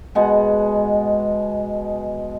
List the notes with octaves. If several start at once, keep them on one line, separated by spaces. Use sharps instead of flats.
B2 G#3 F#5